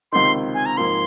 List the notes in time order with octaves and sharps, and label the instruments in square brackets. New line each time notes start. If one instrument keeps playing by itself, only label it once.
[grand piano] C#2 C3 D#3 [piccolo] C6
[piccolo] G#5
A#5
[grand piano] G#2 F3 A#3 [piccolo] C6